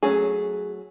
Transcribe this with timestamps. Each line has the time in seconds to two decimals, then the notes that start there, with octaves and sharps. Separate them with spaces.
0.03 F#3 A3 C#4 G#4